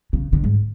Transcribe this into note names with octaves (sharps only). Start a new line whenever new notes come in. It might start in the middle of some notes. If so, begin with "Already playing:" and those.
C#3
D3
G#2